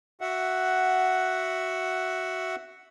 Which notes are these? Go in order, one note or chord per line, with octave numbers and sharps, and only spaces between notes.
F#4 E5 F#5